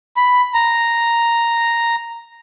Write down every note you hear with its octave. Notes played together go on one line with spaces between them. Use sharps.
B5
A#5